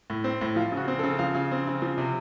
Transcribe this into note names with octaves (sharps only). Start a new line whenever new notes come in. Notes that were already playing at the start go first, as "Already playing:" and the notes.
A2
C4
A2
F3 F4
C#3
F#4
C4
C#3 A4
F3 F5
C#3
C4
C#3
F3
C3